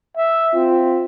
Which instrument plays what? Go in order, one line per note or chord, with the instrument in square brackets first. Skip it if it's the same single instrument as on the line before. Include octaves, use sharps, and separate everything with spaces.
[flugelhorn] E5
[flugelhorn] C4 [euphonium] F4